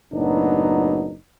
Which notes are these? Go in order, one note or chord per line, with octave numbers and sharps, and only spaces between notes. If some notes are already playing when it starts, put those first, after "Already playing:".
F#1 A2 F#3 B3 D4 D#4